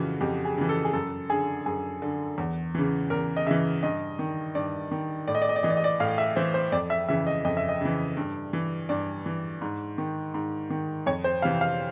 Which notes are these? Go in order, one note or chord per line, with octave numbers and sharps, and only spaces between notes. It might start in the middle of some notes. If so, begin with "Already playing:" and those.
Already playing: F2 C#3 E3 F4 F#4
F2 G4
G#4
C#3 E3
A4
G#4
F#2 A4
D3 G#4
F#2 G#4
D3
E2
C#3 E3
E2 A#4
D#5
C#3 E3 E5
G2 D#5
D#3
G2 D5
D#3
A2 D5
D#5
D5
D#5
D5
E3 D#5
D5
D#5
D5
A2 F5
E5
E3 C5
C5
F2 D5
E5
C#3 E3 E5
D#5
F2 D#5
E5
D#5
C#3 E3
G2
E3
G2 D5
E3
G#2
D#3
G#2
D#3
F2 C#5
C5
C3 E3 F5
F5